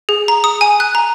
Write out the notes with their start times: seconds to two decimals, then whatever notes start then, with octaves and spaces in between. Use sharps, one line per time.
0.09 G#4
0.28 A#5
0.44 D#6
0.61 G#5
0.80 F#6
0.95 A#5